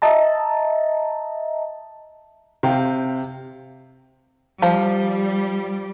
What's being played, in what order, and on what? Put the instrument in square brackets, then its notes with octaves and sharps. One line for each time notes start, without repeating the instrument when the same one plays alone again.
[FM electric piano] D#5 E5 A5 A#5
[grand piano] C3 F5 G5
[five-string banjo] F3 C5 [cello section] G3